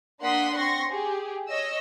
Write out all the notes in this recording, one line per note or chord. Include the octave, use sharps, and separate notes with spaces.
A#3 D4 F#5 C6 D#6 B6
C4 C6 C#6 A#6
G4 G#4
C#5 D#5 E6